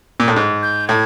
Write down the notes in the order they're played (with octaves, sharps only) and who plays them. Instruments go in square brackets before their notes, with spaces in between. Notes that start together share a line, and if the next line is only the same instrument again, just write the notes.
[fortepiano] A#2
A2
G#2
[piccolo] G6
[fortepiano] A2 [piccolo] G#6